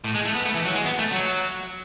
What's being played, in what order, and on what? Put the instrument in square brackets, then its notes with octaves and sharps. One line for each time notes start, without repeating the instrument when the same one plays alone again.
[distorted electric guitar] A2
G#3
A3
B3
A3
E3
F#3
G#3
B3
A3
F#3